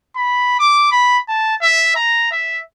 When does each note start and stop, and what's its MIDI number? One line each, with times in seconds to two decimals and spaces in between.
0.16 0.56 83
0.59 0.88 86
0.92 1.18 83
1.28 1.55 81
1.61 1.93 76
1.96 2.30 82
2.31 2.60 76